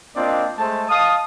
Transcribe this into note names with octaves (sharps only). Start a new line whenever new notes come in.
A#3 C4 D4 F4 D5 D#5
G#3 A3 C5 A5
D#5 F5 A5 D#6